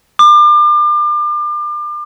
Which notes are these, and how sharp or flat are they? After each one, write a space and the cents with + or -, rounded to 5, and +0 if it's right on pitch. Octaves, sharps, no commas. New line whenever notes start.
D6 +35